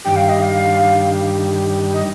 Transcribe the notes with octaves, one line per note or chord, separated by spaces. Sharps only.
G2 D#3 G3 D4 G4 G5
F5
D#5
F5
D#5